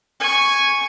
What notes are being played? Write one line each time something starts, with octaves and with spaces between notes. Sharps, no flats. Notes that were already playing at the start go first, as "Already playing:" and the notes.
G#5 C#6